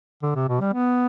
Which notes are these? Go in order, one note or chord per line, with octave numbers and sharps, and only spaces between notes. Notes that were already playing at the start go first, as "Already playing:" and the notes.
D3
C3
B2
G3
B3